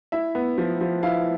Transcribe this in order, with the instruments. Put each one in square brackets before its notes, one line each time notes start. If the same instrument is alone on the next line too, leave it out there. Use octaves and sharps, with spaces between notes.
[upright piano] E4 E5
B3
F3
F3
E4 F5